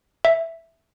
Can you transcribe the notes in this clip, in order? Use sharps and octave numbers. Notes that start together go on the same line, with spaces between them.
E5